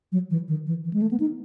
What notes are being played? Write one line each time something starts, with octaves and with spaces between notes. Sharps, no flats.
F#3
E3
D#3
E3
E3
G#3
A3
B3
D#4